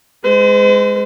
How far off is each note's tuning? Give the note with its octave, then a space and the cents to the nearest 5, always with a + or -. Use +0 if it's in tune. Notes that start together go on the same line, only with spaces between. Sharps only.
G#3 +0 C5 -45